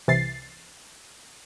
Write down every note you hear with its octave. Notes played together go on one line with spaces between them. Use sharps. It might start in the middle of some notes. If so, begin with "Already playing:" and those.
C2 C3 E3 A6 C7